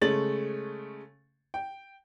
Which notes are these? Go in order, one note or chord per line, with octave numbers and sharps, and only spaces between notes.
C#3 G#3 A3 C#5 A6 F#7
G5